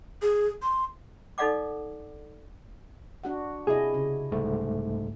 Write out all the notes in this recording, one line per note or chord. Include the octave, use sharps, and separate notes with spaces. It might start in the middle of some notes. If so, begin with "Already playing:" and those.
G#4
C6
D#4 A4 D5 F5 F#5 D6
D4 F#4 F#5
C3 E4 G#4 D#5
C#3
C2 G#2 A3